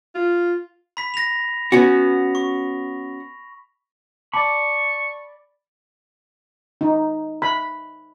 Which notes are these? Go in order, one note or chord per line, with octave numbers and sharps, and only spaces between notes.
F4
B5 B6
A#6 F7
B3 C#4 F#4
C#6
D5 A5 B5 C#6 D6
D#4
B5